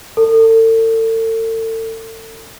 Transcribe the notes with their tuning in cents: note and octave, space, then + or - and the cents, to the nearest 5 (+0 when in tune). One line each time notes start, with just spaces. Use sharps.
A4 +40